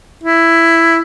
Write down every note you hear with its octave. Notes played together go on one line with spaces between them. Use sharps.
E4